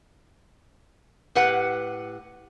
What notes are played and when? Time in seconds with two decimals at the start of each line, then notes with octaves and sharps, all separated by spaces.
1.35 A2 G4 B4 F#5